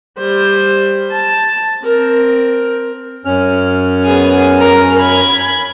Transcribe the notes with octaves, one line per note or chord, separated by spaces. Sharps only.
G3 C5
A5
C4 A#4
F#2 C#4 F6
B3 G#4
A#4
B5 G#6